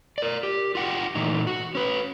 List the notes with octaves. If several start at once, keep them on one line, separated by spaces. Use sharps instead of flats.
A#4 D5
G4
F4 F#4 F#5 G5
A#2 E3 A3 D#4
F#4
C#4 B4